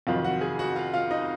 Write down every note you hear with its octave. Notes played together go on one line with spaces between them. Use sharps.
F1 F2 D#3 F#3 F4 F5
F#4 F#5
G#4 G#5
F#4 F#5
F4 F5
F4 F5
D#4 D#5